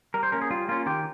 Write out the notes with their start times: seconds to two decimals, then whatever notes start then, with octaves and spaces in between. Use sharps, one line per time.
0.14 G3 A#4
0.23 C5
0.32 A#3 C#4 A#4
0.42 G#4
0.50 G3 F4
0.68 A#3 C#4 F4
0.86 D#3 G4